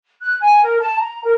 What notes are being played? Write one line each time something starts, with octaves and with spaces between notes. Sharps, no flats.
F#6
G#5
A#4
A5
A#5
A#4